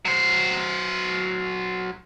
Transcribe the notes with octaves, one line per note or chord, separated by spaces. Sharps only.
F#3 C5